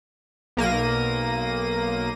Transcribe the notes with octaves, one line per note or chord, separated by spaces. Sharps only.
B1 A#3 A#6 D#7